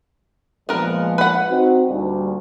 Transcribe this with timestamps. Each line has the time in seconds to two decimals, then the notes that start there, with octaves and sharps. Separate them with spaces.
0.69 A#2 F3 G#3 B3 A#4
1.18 B4 F#5
1.49 C4 D#4 F#4
1.89 D2 A#2 G3